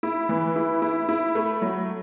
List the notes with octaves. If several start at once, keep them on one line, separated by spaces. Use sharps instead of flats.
E4
E3
E4
E4
E4
A3
F#3